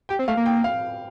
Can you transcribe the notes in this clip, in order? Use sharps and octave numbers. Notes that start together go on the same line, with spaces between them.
G4 G5
C4
A3 F5
A#3
G5
F5